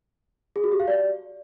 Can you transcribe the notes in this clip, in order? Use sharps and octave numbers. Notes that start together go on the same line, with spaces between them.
G#4
F#4
G4
F5
D5